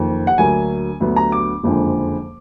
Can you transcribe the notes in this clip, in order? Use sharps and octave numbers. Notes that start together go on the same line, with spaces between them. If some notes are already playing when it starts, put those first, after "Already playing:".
Already playing: F#1 F2 D#3
F#5
D2 D3 F#3 A#3 G#5
D2 D3 F#3 B3
A#5
D6
F#1 F2 D3 F3 G#3